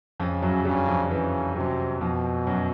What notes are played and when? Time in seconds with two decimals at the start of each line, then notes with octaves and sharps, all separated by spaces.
0.20 F2 C#3 F3
0.42 F#2 F#3
0.65 G2 C#3 G3
0.88 F2 F3
1.11 C#3 E3
1.56 F#2 C3 F#3
2.01 F2 B2 F3
2.47 F#2 F#3